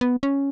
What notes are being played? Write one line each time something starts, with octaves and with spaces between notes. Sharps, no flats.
B3
C#4